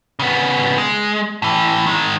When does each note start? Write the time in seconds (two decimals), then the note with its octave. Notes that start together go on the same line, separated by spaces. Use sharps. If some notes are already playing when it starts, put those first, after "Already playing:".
0.19 C#3 B3
0.78 G#3
1.42 A2 E3
1.86 D#3 G#3